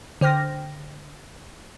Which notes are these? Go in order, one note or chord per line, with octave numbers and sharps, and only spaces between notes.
D3 C5 G5 F6 A#6